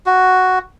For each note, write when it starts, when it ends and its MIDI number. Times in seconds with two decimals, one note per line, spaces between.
0.06 0.59 66